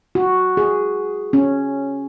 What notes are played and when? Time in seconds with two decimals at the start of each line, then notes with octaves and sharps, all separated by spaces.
0.15 F#4
0.57 G#4
1.33 C#4